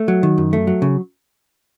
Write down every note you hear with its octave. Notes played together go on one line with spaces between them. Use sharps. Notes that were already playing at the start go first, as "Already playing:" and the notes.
Already playing: A3
F#3
D#3
F#2
A3
F#3
C#3